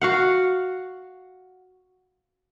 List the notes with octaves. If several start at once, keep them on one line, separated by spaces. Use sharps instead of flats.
F#4 F5 F#5